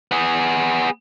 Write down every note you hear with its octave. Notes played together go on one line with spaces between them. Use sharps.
B3 G#4